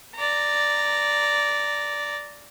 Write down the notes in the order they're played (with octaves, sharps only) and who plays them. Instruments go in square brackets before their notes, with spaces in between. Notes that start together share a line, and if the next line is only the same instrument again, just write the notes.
[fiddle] D5 A#5